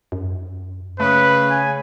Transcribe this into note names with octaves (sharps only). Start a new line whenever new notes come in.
F#2
C#3 A3 B4
G#5